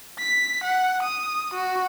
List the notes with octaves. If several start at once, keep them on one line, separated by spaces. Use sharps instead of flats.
B6
F#5
D#6
F#4